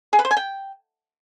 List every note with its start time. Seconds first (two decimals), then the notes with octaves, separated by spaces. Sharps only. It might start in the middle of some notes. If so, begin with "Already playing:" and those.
0.13 G#4
0.19 B4
0.25 C5
0.31 G#5
0.37 G5